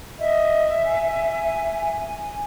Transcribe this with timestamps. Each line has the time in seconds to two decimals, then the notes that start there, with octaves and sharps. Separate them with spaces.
0.19 D#5 E5
0.84 G#5